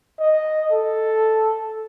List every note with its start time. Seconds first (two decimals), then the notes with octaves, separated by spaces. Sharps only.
0.19 D#5
0.72 A4